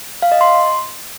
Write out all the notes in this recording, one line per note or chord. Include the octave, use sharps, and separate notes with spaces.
F5
D#5
C6